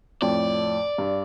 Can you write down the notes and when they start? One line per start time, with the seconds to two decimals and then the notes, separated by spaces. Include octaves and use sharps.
0.22 F2 A2 D5
0.98 G2